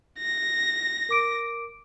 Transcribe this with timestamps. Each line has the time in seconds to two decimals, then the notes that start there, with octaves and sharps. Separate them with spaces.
0.19 A#6
1.09 A#4 D6 D7